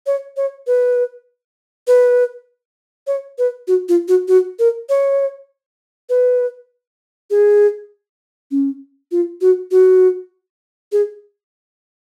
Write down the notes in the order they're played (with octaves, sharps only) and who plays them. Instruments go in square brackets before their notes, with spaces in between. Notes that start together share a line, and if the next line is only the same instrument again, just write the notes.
[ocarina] C#5
C#5
B4
B4
C#5
B4
F#4
F4
F#4
F#4
A#4
C#5
B4
G#4
C#4
F4
F#4
F#4
G#4